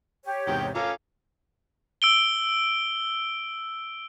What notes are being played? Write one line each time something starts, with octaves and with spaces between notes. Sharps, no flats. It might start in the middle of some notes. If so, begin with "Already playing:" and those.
G4 C#5
E2 G#2 C3 D#3 G5
C#4 F4 A4 F5 A#5 D6
E6 D7 G7